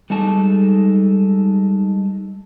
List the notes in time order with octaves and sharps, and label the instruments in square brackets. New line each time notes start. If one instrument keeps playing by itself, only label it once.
[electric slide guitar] G3 G#3 D#4 A4 A5